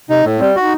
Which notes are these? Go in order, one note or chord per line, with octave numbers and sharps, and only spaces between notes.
C3 D#4
A2 A3
G3 C4
D#4 F#4